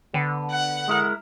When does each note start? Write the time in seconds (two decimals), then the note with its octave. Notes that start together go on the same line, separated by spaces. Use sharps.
0.14 D3 B3
0.51 F#5
0.88 G#3 E4 A#4